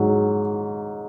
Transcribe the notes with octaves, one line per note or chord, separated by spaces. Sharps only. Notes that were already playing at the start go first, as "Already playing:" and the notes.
Already playing: G#2 F#3